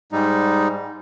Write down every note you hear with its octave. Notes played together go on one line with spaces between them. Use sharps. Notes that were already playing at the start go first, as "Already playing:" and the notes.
G#2 G3 D#4